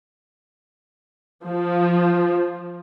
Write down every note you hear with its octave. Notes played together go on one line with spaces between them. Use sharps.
F3